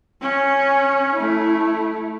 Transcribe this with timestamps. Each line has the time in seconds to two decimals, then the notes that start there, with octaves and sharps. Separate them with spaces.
0.21 C#4
1.15 A3 E4